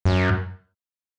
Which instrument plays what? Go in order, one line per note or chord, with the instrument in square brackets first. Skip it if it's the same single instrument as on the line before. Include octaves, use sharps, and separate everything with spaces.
[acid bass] F#2